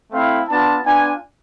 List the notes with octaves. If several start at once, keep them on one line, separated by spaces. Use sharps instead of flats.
A3 C4 E4 F5
B3 D4 F4 A5
B3 D4 F4 G#5